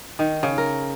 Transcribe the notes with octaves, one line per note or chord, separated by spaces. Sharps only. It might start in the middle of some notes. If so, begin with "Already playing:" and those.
D#3
C#3
A#4